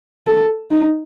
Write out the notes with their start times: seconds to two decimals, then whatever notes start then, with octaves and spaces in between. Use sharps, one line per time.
0.27 A4
0.70 D#4